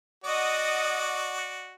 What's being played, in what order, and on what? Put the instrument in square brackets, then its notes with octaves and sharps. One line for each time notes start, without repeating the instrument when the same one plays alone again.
[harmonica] F#4 D5 [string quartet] D#5 F#5 D#6